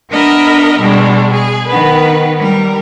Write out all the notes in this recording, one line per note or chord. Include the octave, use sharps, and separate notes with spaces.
B3 D4 A#4 D#5 E5
B2 G3 G#3 D4
G#4
D#3 B3 B4
G3 A#4